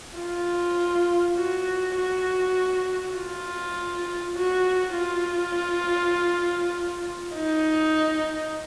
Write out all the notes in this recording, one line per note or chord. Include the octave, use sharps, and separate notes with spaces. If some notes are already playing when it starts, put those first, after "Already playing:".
F4
F#4
F#4
F4
F#4
F4
D#4